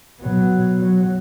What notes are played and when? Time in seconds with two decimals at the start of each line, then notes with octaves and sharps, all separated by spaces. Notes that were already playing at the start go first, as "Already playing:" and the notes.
0.20 B2 F#3
0.80 F#3